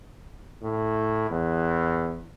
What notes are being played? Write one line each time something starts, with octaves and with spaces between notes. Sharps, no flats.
A2
E2